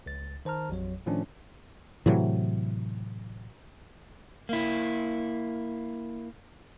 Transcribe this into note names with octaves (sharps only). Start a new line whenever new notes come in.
C#2 A6
D#3 C5 A5 A#5 F6
A1 F2 F#3 C#5
A2 D#3 F3 A3 C#4 D4
A2 C3 E3 F#3
A#3 E4